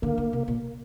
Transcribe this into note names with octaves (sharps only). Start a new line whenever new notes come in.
D3 A#3
D3
C3
A#2